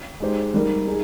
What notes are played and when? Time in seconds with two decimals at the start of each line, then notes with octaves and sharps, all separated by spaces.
0.20 G#3 D#4 G4 C5
0.54 G3 A#3 D#4 A#4
0.87 D#4 G#4